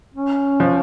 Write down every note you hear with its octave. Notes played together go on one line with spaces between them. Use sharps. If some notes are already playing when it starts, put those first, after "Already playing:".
C#4
F3